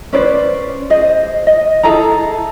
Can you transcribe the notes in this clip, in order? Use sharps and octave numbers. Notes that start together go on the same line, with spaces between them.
C#4 B4 C5 D5
G#4 C5 D#5
D#5
E4 G#4 A4 A#5